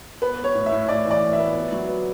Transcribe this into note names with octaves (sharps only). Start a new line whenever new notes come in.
B3 B4
B3
C#5
A2
E5
A2
A2 D5
E3 D5
A2
E5
B3
B3
F#3
B3